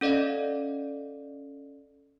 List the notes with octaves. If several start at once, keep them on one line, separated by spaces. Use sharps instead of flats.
C#4 A4 D5 D#5 F5